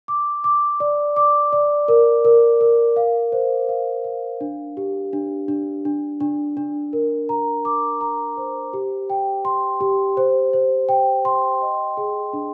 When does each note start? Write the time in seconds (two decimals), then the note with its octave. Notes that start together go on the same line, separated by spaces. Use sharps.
0.08 D6
0.44 D6
0.80 D5
1.16 D6
1.53 D5
1.88 A#4
2.25 A#4
2.61 A#4
2.96 F5
3.32 C5
3.69 F5
4.04 F5
4.41 D4
4.77 G4
5.13 D4
5.48 D4
5.85 D4
6.20 D4
6.57 D4
6.93 A#4
7.29 A#5
7.65 D6
8.01 A#5
8.37 C5
8.73 G4
9.10 G5
9.45 C6
9.81 G4
10.17 C5
10.53 C5
10.89 G5
11.25 C6
11.62 D#5
11.97 G#4
12.33 D4